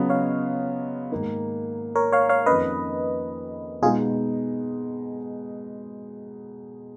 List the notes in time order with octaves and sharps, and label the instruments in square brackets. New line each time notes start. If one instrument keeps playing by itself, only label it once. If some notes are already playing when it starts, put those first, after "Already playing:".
Already playing: [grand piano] C#3 F#3 B3 F4 [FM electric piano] D#5
[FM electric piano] C#5 F5
[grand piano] G#2 D#3 A#3 D#4
[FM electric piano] A#4 C#5
C#5 F5
C#5 F5
[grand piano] F2 D#3 A#3 C#4 [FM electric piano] B4 D#5
[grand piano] B2 G#3 B3 D#4 [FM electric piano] F4 G#4